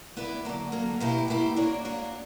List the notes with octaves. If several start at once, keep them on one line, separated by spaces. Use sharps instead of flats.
B3 E4 B4 D5
D3 F#3 A#3
D3 F#3 A#3
B2 A#3 E4 G4
B2 A#3 E4 G4
A#3 D4 F#4 C#5
A#3 D4 F#4 C#5